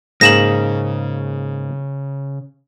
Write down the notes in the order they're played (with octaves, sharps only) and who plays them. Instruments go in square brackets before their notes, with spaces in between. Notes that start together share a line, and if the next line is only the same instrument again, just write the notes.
[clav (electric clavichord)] G#2 A#3 G#4 [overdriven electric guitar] C#3 [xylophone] A#6 E7 F#7